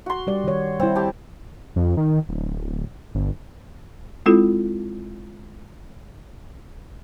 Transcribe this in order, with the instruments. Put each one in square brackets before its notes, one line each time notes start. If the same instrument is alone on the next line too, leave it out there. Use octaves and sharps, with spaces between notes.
[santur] F#4 C6
[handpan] G3 G4 D5
D#3 C#5
[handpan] G3 E4 [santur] C4
[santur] G4 A5
[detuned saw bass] F2
D#3
D1
G1
[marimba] G#3 C4 E4 F4 A4